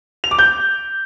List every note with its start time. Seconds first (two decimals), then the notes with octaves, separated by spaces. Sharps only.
0.24 F7
0.31 D6
0.39 G6